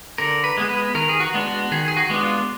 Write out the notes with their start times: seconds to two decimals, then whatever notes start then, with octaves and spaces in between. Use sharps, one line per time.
0.18 D3 A#4
0.44 B4
0.57 G#3 B3
0.69 B4
0.95 D#3 A#4
1.09 G#4
1.20 F#4
1.34 G#3 B3 D4
1.46 F#4
1.71 D#3 G#4
1.88 G#4
1.97 F#4
2.10 G#3 B3 D4
2.23 F4